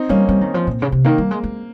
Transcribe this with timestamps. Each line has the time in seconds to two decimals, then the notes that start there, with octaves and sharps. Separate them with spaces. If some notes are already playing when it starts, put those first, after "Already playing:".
Already playing: C4 D#4
0.09 G3 A#3 C#4
0.28 G3 C4
0.41 D#3
0.54 F3
0.67 A#2
0.82 C#3
0.92 C3
1.05 D#3 A#3
1.18 G3
1.31 G#3
1.44 G#3